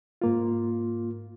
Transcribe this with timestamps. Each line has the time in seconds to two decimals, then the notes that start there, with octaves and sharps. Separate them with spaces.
0.21 G#2 A#3 F4